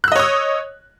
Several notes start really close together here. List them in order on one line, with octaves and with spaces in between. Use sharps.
F#6 E6 D#5 C#5 D#6